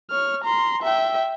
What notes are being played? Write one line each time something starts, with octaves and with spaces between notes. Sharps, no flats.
C#5 F6
A#5 C6
E5 G5